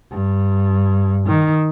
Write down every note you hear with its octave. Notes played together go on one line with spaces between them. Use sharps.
G2
D#3